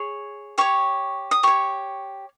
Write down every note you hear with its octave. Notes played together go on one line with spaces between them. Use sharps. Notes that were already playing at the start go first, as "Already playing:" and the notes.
Already playing: G#4 C#5
G4 C#5 C#6
D#6
G4 C#5 C#6